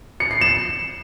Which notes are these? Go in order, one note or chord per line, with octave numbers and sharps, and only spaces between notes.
C#7
C7
E7